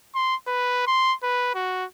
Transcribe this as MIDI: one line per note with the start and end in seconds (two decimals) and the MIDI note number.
0.15 0.36 84
0.48 0.82 71
0.87 1.14 84
1.23 1.50 71
1.55 1.85 66